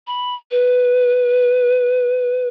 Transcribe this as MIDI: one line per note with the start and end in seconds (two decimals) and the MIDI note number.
0.07 0.34 83
0.51 2.48 71